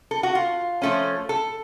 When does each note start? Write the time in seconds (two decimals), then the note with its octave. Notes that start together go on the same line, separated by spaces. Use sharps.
0.11 A4
0.23 F#4
0.35 F4
0.82 F3 A3 C#4
1.29 A4